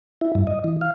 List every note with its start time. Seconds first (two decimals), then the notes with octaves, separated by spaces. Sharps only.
0.21 E4
0.35 G2
0.47 D#5
0.64 E3
0.81 F5